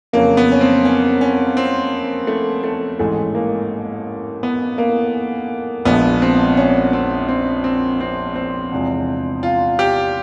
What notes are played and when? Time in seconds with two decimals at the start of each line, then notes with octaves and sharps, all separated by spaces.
0.13 F2 C#3 F#3 A#3
0.37 B3
0.52 C#4
0.61 C4
0.85 C#4
1.21 C#4
1.57 C4
2.27 A3
2.64 A3
2.99 A1 G#2 E3 G#3 A3
3.35 A#3
4.43 B3
4.78 A#3
5.85 A#1 A#2 F3 G#3 B3
6.22 C4
6.57 C#4
6.93 C4
7.28 C4
7.64 C4
8.01 C4
8.36 C4
8.72 E2 C3 F3 G#3
9.43 F4
9.79 G4